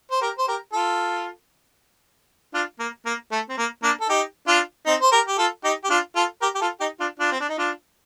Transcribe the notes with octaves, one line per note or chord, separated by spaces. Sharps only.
C5
G4 A#4
C5
G4 A#4
F4 A4
D4 F4
A#3
A#3
A3
C4
A#3
A#3 D4
A4
D#4 G4
D4 F4
C4 D#4
C5
G4 A#4
G4
F4 A4
D#4 G4
G4
D4 F4
F4 A4
G4 A#4
G4
F4 A4
D#4 G4
D4 F4
D4 F4
C4
D4
D#4
D4 F4